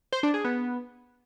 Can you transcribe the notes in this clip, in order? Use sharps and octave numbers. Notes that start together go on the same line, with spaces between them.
C5
D4
G#4
B3